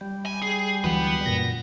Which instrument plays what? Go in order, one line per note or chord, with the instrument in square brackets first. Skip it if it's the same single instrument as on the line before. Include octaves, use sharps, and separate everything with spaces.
[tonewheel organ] G3
[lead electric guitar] G#5
G#4
[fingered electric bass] D2 E3 F#3 [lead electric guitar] B4 F#5
[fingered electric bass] F#2 A#2 [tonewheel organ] A#6